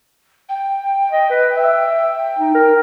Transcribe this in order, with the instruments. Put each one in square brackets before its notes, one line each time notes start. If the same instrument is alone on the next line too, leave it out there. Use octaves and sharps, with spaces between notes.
[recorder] G5
[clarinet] D#5
B4
E5
D#4
A#4